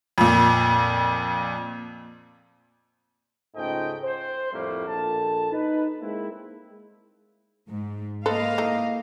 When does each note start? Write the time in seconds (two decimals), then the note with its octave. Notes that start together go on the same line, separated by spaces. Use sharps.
0.18 F2 A#2
3.56 C#2 G#2 A3 D#5 G5
4.03 C5
4.52 F2 A2 G3 A3 A#3
4.87 A#1 A4 A5
5.51 D#4 B4
6.00 G#3 A#3 C4 E4
7.68 G#2
8.26 A#3 A4 B4 C5 D#5 F5
8.58 E3 A3 D#4